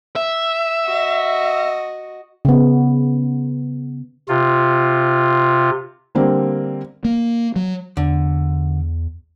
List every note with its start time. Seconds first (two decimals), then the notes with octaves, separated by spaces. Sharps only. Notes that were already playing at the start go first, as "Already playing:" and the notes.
0.16 E5
0.85 F#4 D#5
2.45 C#3 B3
4.29 C3 F4
6.15 D3 G3 A#3 C4
7.05 A#3
7.56 F#3
7.97 E2 D3